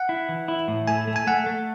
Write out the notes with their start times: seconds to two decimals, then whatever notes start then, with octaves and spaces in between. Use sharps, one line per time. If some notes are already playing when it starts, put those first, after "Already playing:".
Already playing: F#5
0.09 E4
0.29 E3
0.48 E4
0.68 A2
0.88 A3 G#5
1.07 A3
1.16 G#5
1.27 A3 F#5
1.46 A3